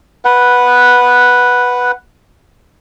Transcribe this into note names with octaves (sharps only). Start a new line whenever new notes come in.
B4 F#5